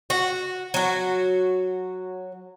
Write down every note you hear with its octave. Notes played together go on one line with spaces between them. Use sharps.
F#4
F#3 F#4